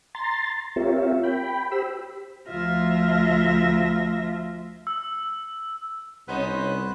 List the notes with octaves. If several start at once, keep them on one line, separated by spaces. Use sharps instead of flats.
A#5 C6 A6
C4 F4 G4 A#4 C#5 E5
G5 B5
G4 C5 B5 E6
D2 F3 F4 E5 A#6
E6
C2 B3 C#4 D#4 C5 B5 F#6